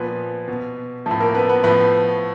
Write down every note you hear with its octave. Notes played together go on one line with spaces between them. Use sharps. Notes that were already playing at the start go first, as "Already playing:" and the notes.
Already playing: A#2 F3 B3 B4
B2
A2 F3 A3 A4
A#3 A#4
B3 B4
B3 B4
A2 F3 B3 B4